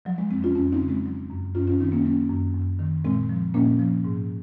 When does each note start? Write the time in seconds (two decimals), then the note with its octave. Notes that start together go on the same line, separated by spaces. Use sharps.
0.05 F3 F#3
0.18 G#3
0.31 F2 G#3 C4
0.43 C#4 F4
0.55 F2 C#4 F4
0.72 C4 D#4
0.80 C#3
0.89 G#3 C4
1.06 F#3
1.30 F#2
1.55 F#2 C#4 F4
1.67 C#4 F4
1.80 D#3 C4 D#4
1.92 A#3 C#4
2.05 F#3 A#3 C#4
2.30 F#2
2.55 F#2
2.79 D#3
3.05 A#2 G#3 C4
3.29 F3
3.54 A#2 A#3 C#4
3.79 F3
4.05 G#2